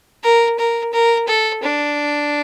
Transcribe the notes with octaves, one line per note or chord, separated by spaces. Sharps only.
A#4
A#4
A#4
A4
D4